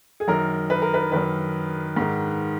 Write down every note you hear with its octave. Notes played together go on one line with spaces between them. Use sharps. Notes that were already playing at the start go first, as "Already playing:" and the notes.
G#4
F#2 D#3 A#4
B4
A#4
B4
F#2 D#3 B4
G#2 D#3